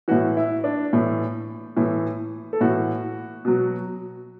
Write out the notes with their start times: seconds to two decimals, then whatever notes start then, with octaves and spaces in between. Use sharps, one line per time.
0.08 A2 E3 F#4
0.37 E4
0.64 D4
0.93 A2 E3
1.77 A2 E3
2.53 A4
2.60 A2 E3 F#4
3.45 B2 F#3